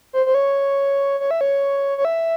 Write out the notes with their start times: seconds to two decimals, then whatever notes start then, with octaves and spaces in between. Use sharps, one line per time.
0.13 C5
0.26 C5
0.34 C#5
1.20 C#5
1.31 E5
1.41 C#5
1.98 C#5
2.05 E5